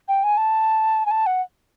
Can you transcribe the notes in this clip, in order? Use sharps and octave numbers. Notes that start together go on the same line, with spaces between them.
G5
G#5
A5
G#5
A5
F#5